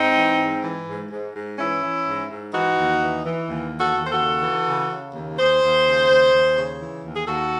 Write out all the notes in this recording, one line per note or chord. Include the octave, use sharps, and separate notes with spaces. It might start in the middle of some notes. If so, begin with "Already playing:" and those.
Already playing: G#2 C4 D#4
E3
G#2
E3
G#2
G#2
G#2
E3 C#4 E4
E3
G#2
G#2
E3 D#4 F#4
D#2
E3
E3
D#2
E3
F#4 A4
D#2
C5
F#4 A4
C#3
E3
C#3
C#3
D#2
D#2 G#4 C5
D#2
C#3
D#2
D#2
C#3
E3
D#2
G#4
D#2 F#4 A4